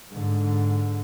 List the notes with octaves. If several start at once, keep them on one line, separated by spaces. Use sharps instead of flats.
G#2 D3